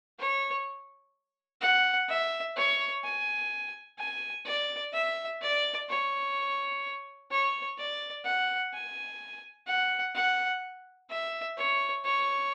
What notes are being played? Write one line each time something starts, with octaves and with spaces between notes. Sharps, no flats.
C#5
F#5
E5
C#5
G#5
G#5
D5
E5
D5
C#5
C#5
D5
F#5
G#5
F#5
F#5
E5
C#5
C#5